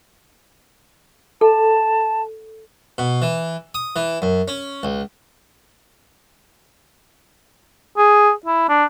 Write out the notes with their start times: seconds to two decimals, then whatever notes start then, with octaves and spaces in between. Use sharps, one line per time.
1.41 A4 A5
2.98 B2
3.22 E3
3.75 D#6
3.96 E3
4.22 F#2
4.48 C#4
4.83 C#2
7.98 G#4
8.46 E4
8.69 D4